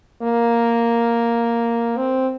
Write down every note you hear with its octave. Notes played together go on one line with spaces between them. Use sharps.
A#3
C4